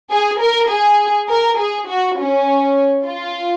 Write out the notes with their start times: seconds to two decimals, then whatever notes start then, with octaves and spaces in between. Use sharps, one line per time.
0.11 G#4
0.40 A#4
0.69 G#4
1.29 A#4
1.58 G#4
1.88 F#4
2.18 C#4
3.07 F4